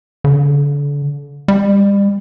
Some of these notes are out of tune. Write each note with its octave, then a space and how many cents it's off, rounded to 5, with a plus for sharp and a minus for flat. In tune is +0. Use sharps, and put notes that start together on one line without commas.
D3 -35
G3 +35